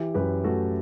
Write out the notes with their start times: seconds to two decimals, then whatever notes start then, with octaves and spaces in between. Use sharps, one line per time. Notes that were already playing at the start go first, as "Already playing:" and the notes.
Already playing: E3 E4 G4
0.14 F#2 G4 B4
0.44 A3 F#4 A4